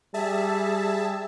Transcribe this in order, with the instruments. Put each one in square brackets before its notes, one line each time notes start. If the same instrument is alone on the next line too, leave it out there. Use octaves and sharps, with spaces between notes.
[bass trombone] G3 [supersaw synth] G#4 E5 A5